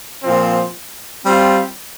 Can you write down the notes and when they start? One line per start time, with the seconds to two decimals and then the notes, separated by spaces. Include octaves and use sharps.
0.23 A#2 F3 C4
1.24 G3 C4 F4